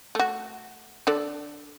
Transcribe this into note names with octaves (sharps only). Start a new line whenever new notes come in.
A3 F#4
D3 A4 D5